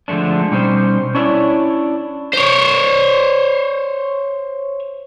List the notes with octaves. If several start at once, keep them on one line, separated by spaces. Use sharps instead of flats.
D3 F3 G#3 A3 D4
B2 G3 C#4 D#4 C5
C#4 D4 E4 A#4 C#5 D5
C5 C#5